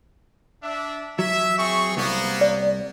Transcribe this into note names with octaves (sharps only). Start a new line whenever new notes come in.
D4 E5
F#3 E5
C4 G#4 C#6
C2 A#3 B3
D5